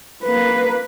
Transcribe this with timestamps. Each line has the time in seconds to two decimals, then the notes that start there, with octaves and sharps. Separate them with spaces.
0.23 A#3 B4